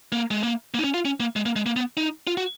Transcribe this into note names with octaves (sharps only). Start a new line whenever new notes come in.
A#3
G#3
A#3
A#3
D#4
C#4
F4
C#4
A#3
G#3
A#3
G#3
A#3
B3
D#4
F4
F#4